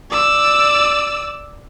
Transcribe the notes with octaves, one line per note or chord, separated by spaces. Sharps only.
D5 E6